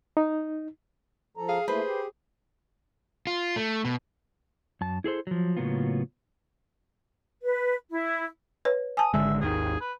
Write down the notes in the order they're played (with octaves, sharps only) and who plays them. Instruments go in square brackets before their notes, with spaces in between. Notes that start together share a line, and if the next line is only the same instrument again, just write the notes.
[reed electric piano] D#4
[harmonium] F3 A4 A#5
[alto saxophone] G#4 [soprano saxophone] F5
[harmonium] A3 A#3 E4 [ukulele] B4 [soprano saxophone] C5
[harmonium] G4
[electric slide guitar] F4
A3
B2
F#2 A5
E4 G#4 A4 C5
F3 F#3
A2 C#3 F#3 A#3 B3 F4
[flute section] B4
E4
[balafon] B4 C#5
[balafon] G#5 A5 [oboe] D#6
[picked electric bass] G#1 D3 G#3 [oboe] E5
[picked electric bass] G#1 D#2 D#3 [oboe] G#4
[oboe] B4